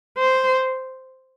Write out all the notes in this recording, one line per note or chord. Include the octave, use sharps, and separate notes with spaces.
C5